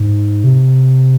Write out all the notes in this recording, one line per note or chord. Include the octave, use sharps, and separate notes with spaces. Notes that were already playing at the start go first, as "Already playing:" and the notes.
Already playing: G#2
C3